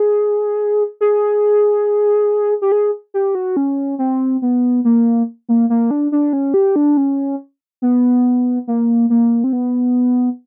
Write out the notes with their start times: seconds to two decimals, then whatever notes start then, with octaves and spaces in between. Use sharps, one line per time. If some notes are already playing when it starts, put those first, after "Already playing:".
Already playing: G#4
1.01 G#4
2.62 G4
2.72 G#4
3.14 G4
3.35 F#4
3.57 C#4
3.99 C4
4.42 B3
4.84 A#3
5.49 A#3
5.70 A#3
5.91 D4
6.12 D4
6.33 C#4
6.54 G4
6.76 D4
6.97 C#4
7.82 B3
8.67 A#3
9.10 A#3
9.44 C4
9.53 B3